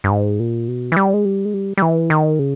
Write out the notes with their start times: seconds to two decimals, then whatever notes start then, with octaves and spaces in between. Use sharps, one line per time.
0.04 G2
0.11 G#2
0.40 A#2
0.68 B2
0.92 E3
0.97 G3
1.14 G#3
1.25 G3
1.45 G#3
1.54 G3
1.78 G3
1.82 E3
2.10 D#3
2.39 C#3